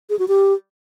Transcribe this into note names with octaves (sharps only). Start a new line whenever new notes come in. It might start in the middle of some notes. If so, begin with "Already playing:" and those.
G#4
F#4
G4